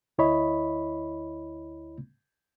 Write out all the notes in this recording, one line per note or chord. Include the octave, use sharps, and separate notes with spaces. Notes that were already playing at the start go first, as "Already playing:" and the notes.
D2 E4 C#5 D#5 B5